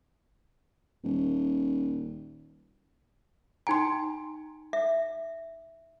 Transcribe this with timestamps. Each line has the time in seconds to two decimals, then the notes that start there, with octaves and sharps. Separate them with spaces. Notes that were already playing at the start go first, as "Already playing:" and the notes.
1.04 D#1
3.67 D#4 G5 G#5 A#5 C6
4.73 E5